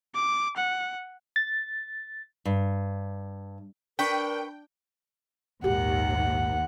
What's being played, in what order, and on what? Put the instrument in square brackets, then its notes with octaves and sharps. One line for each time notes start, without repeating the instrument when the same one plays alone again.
[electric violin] D6
F#5
[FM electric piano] A6
[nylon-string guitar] G2
[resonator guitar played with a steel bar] D4 [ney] A#4 [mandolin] B4 B5 C#6 [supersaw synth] G5
[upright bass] A#1 G#2 [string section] D#2 [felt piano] G4 [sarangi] F#5